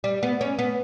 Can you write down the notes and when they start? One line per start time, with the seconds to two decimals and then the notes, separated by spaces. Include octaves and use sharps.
0.04 G3
0.23 B3
0.41 C#4
0.59 B3